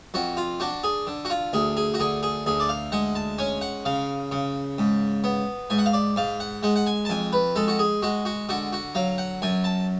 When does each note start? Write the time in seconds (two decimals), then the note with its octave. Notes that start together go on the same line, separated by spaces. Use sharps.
0.14 F2 F#4
0.37 F4
0.60 D4 F#4
0.84 G#4
1.07 D3
1.25 F#4
1.30 F4
1.53 D2 G#4
1.77 G#4
1.94 F#4
2.00 D3 G#4
2.23 G#4
2.46 D2 G#4
2.60 D5
2.69 F5
2.92 G#3 F#5
3.15 A5
3.38 C#4 G#5
3.61 F#5
3.85 C#3 F5
4.32 C#3
4.78 G#2
5.24 B3
5.70 G#2 G#5
5.78 F#5
5.86 F5
5.93 D5
6.16 G#2 F5
6.40 F#5
6.63 G#3 F#5
6.76 F#5
6.86 G#5
7.05 A5
7.09 F2 G#5
7.33 B4
7.56 G#3 A4
7.68 F#4
7.79 G#4
8.02 G#3 F#4
8.25 F#4
8.49 D3 F#4
8.72 F#4
8.95 F#3 F5
9.18 F#5
9.42 F#2 G#5
9.64 A5